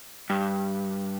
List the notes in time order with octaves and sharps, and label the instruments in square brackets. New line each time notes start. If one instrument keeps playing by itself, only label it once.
[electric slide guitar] G2